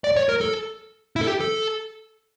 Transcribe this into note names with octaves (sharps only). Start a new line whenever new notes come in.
D5
C#5
A#4
A4
E4
A4
G4
A4